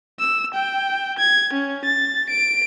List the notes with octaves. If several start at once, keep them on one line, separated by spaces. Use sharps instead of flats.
E6
G5
G#6
C#4
A6
D7